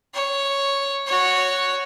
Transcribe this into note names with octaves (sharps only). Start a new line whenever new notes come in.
C#5
F#4 C#5